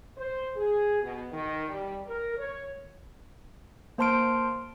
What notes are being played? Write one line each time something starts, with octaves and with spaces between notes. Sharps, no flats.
C5
G#4
B2
D#3
G3
A#4
C#5
A#3 C5 A5 C6 F6 D7